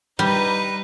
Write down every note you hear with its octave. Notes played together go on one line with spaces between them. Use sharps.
G3 D#4 B4